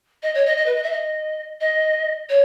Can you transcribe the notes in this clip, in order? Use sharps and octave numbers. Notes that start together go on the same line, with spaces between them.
D#5
C#5
D#5
D#5
B4
D#5
E5
D#5
D#5
C#5